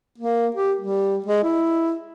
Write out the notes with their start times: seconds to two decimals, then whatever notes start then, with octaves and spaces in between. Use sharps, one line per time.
0.18 A#3
0.55 G4
0.81 G3
1.26 G#3
1.43 E4